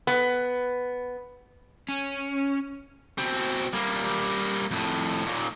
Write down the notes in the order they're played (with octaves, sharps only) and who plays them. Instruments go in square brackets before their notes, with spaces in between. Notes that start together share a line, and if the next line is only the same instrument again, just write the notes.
[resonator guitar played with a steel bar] B3
[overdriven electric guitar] C#4
B2 C4
G3 A#3
F2 A2
D#2 A#2